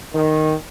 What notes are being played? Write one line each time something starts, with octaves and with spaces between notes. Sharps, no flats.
D#3